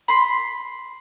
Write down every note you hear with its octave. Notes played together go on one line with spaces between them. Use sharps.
B5 C6